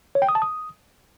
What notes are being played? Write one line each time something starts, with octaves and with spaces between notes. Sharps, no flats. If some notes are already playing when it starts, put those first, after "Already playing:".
C#5
G5
D#6
A5
D#6